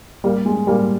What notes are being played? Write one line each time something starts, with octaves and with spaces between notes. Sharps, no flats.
G3 A#3
G#3
G3 A#3